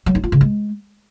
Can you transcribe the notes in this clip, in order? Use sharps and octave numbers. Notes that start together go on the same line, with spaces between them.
F#3
D#4
F4
C#3
G#3